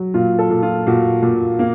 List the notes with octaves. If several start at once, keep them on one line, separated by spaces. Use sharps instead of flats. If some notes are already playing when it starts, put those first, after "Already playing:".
Already playing: F#3
A#2 F4
A4
A#2
F4
A#2 F#4
A#2
A#3